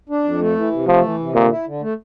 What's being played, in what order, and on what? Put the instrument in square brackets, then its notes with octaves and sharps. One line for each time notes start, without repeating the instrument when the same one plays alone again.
[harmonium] D4
F2
A3
E3
C3
[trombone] F3 [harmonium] A3
[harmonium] E3
C3
[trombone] A#2 [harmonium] D3
[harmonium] E4
D3
A3